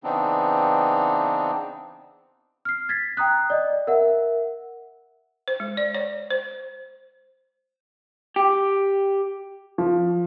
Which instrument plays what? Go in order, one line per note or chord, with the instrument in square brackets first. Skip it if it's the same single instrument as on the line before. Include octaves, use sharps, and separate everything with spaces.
[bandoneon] C#3 E3 B3 C4 D4 D#4
[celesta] F6 C7
G#6 A6 B6 C7
G5 A#5 D#6 F#6
D5 D#5
A#4 E5 F#5
[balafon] C5
G#3
D5
C#5
C5
[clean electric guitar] G4
[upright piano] F3